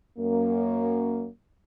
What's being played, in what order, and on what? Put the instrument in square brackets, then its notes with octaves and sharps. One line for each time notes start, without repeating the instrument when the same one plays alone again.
[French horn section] F#2 A#3